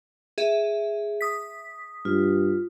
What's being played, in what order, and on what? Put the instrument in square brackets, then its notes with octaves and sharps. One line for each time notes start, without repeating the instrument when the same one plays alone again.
[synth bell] G#4 E5
D#6 B6
[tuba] G2 [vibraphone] F4